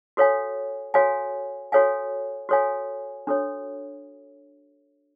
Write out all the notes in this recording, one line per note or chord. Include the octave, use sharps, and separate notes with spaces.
F#4 A4 C#5 F5 G#5
F#4 A4 C#5 F5 G#5
F#4 A4 C#5 F5 G#5
F#4 A4 C#5 F5 G#5
D4 F#4 A4 C#5